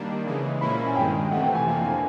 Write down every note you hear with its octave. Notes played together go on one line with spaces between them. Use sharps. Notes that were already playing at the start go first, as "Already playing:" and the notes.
Already playing: D#3 G3 A#3 D4
C#3 E3 G#3
A#2 F3 A#3 C#4 E4 B5
G#5
G2 D#3 G#3 G5
C3 E3 A3 F#5
G5
G#5
F2 D3 F3 A#3
G#5